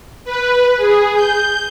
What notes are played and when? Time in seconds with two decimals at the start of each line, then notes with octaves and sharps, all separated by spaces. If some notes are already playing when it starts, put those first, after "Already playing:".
0.25 B4
0.77 G#4
1.14 G6